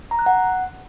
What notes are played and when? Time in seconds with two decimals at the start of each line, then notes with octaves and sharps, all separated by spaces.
0.11 A#5
0.19 F#6
0.26 F#5